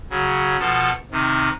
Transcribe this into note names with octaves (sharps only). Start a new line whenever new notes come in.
C#3 F#3
B2 F3 A4
C3 D#3